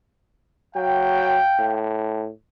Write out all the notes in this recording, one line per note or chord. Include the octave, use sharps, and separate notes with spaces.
F#3 F5 G5
A2